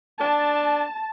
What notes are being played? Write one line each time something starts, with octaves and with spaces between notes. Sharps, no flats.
D4 A5